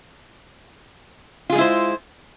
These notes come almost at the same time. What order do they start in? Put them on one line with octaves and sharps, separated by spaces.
F4 G#4 G#3 E4 C5